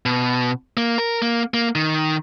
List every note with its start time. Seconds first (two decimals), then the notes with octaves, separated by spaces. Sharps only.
0.06 B2
0.77 A#3
0.98 A#4
1.22 A#3
1.54 A#3
1.75 D#3